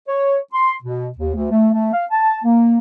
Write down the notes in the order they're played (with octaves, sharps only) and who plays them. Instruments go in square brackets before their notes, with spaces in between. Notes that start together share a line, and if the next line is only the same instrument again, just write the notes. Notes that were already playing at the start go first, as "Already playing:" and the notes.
[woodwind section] C#5
C6
B2
D#2
D2
A3
A3
F5
A5
A#3